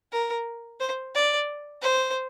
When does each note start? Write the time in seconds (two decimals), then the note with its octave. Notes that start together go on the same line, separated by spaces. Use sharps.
0.12 A#4
0.80 C5
1.15 D5
1.82 C5